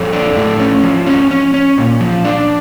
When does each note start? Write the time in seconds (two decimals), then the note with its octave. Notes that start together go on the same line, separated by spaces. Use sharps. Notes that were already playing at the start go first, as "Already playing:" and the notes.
Already playing: F2 A4 C#5
0.13 D4
0.37 A2
0.59 C#4
0.83 F3
1.07 C#4
1.31 C#4
1.54 C#4
1.78 A#2
2.01 F3
2.24 D4